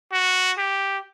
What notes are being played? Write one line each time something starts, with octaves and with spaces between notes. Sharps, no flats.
F#4
G4